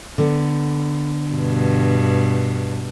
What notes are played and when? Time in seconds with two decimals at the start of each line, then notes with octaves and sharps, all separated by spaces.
0.18 D3 B3
1.30 G2 B2